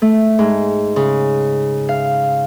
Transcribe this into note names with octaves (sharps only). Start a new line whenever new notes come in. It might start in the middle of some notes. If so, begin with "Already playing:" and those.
A3
G#2
C#3
F5